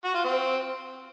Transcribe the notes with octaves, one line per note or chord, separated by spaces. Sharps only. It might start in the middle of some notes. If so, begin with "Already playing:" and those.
F#4
F4
C4